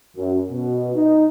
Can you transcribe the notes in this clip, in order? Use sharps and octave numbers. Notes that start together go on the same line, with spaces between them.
F#2
B2
D#4